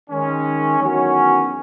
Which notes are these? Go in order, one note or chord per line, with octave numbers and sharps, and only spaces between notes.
D#3 G#3 C#4
E2 D#3 F#3 C#4 F#4